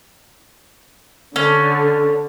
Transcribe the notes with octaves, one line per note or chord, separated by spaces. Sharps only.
D3 C#4